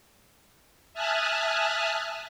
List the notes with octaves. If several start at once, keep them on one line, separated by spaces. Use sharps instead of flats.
E5 G#5 A5 D#6 F6 F#6